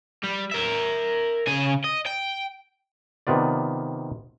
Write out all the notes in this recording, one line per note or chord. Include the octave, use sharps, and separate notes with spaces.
G3
A#4 E5
C#3 G#5
D#5
G5
C3 D#3 B3 F4 D5